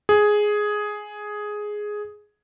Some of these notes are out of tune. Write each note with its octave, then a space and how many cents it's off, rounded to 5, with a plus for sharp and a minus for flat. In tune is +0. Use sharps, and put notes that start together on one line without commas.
G#4 +5